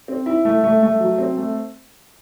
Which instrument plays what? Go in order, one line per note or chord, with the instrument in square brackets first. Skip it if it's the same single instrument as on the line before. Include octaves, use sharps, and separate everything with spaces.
[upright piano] C4
E4
A3
A3
A3
F#3
C4
A3